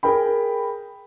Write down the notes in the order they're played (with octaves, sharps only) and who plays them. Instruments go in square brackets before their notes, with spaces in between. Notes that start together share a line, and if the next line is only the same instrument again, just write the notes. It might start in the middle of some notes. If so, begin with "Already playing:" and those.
[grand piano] G#4 A#4 G5 B5